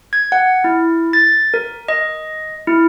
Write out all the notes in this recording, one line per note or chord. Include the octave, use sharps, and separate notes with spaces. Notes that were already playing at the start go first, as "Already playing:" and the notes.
G#6
F#5
E4
A6
A#4
D#5
E4